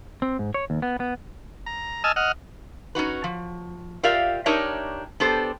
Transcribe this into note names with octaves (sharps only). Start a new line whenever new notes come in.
C4
G#2
C#5
D#2
B3
B3
A#5
D#5 G#5 A5 E6 F6
D#5 F#5 F6
C#4 D#4 F#4 B4
F3
F4 G4 A#4 D5 E5 F5
D4 D#4 G4 A#4 C#5 E5
B3 D4 G4 A4 C5